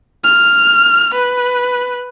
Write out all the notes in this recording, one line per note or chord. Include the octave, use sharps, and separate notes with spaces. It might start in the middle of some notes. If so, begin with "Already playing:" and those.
F6
B4